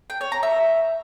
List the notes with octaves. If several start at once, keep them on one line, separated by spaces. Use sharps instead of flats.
G5
C#5
A#5
E5